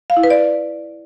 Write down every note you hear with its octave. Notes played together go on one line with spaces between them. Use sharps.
F5
E4
B4
D5